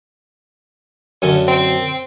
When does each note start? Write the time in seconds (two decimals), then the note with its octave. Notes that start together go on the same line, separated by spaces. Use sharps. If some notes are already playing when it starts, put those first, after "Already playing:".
1.22 F#2 D3 C#4
1.48 C4